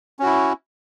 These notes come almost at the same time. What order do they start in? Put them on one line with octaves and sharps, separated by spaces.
C#4 F#4 E4